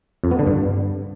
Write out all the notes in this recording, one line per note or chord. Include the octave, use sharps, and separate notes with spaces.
F2
B3
D3
G2